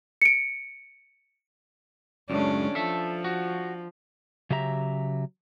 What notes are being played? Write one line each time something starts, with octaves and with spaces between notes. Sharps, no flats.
C#7 D7
C#2 F#2 A2 G#3 C#4 D4
F3 A4 E5
F#4
C#3 F#3 G4 E5 A#5